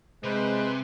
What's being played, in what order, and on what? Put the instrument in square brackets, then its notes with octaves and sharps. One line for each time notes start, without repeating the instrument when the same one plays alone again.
[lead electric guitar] C3 [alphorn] G#3 [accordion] B4 C5